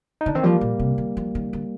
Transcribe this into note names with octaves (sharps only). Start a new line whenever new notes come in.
D#4
D3 D4
D#3 C4
F3 G3 A#3
A#2
C3
D#3
F3
D#3
D3